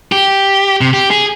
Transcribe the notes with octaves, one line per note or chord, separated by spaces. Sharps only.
G4
C3
G4
G#4